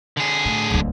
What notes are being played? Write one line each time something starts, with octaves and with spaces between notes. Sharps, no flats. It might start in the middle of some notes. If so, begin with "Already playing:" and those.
D3 G#4
A2
D1 C#2